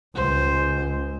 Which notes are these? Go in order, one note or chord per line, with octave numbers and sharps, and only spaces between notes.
C#2 C5